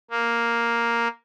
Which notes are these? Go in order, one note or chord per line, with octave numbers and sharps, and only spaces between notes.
A#3